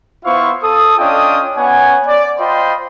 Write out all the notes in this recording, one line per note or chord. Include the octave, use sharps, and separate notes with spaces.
B3 E4 F4 C5 F5 C#6
A4 D#6
C#4 D4 F4 D#5 G5 D#6
B3 C#4 C#5 F#5 G#5
D5
F4 C5 D#5 G5 B5 C6